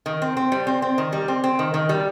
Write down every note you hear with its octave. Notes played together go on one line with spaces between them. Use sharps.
D#3
C4
C4
G3
C4
C4
D#3
G3
C4
C4
D#3
D#3
G3